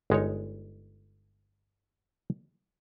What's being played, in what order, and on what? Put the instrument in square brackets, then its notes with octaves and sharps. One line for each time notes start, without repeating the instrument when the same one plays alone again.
[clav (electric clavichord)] G1 G#3 D#4 C#5